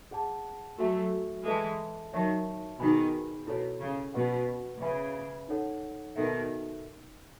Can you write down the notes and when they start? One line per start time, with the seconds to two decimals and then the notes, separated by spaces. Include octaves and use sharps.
0.11 G#4 D#5 F#5 A5
0.78 F#3 A3 F#4 A4 E5 G#5 C#6
1.45 E3 G#3 A4 E5 A5
2.12 D#3 F#3 C#5 E5 A5 C#6
2.80 B2 D#3 D#4 G#4 D#5 G#5 B5
3.47 B2 E4 A4 C#5
3.80 C#3
4.14 B2 B4 D#5 F#5 C#6
4.81 C#3 B4 E5 G#5 B5
5.48 D#4 A4 C#5 F#5
6.16 B2 D#3 D#4 A4 E5